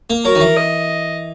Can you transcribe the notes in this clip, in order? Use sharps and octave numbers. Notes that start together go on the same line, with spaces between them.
A#3
F#3 A#4
D#3
E3
D#5